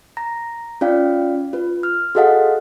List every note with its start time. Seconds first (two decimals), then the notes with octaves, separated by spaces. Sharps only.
0.17 A#5 A#6
0.81 C#4 F4 D5 F5 G5
1.53 F4 B4
1.83 F6
2.15 F#4 G#4 A4 D#5 F5 F#5